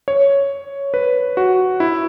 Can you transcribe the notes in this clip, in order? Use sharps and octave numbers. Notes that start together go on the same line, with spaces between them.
C#5
B4
F#4
E4